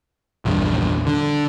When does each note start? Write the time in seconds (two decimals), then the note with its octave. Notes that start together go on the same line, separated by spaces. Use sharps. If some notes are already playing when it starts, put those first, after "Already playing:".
0.45 A#1 E2 G2
1.06 D3